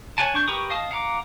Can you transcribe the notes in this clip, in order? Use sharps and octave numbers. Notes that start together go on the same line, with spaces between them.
C#5 F#5 G#5 A5
D4 C#6 G6
G4 A#4 B4 C#6 D#6
D#5 F5 A5 D#6
F5 F#5 A#5 D6